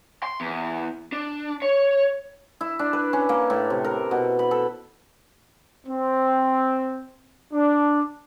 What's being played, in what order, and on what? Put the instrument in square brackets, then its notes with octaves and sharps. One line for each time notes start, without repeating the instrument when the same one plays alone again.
[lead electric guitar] C6
E2
D4
C#5
[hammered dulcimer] E4
D4
B4
C#4
A#3
A2
C3
A#4
B2
B5
A4
[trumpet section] C4
D4